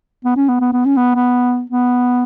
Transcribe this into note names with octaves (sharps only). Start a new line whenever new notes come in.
B3
C#4
B3
B3
B3
C#4
B3
B3
B3